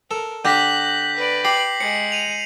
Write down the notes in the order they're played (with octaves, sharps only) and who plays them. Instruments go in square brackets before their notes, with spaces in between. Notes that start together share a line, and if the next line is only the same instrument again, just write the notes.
[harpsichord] A4 [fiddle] A#4
[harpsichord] D3 G4 [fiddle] F#6 [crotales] G6 A#6 B6
[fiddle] B4 D5
[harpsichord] G4 [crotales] A#6 C7 F#7
[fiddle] G#3 [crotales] C#7
[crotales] D#7 F7